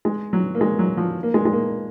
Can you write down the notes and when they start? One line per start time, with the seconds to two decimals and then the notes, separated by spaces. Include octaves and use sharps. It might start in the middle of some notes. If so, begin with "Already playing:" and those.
0.05 G#3
0.33 F#3
0.55 A#3
0.61 G#3
0.79 F#3
0.97 F3
1.23 A#3
1.34 G#3
1.45 G#3
1.53 A#3